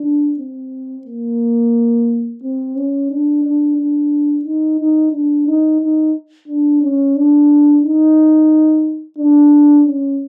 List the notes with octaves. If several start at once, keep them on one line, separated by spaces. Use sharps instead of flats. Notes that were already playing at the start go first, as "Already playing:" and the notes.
Already playing: D4
C4
A#3
C4
C#4
D4
D4
D4
D#4
D#4
D4
D#4
D#4
D4
C#4
D4
D#4
D4
C#4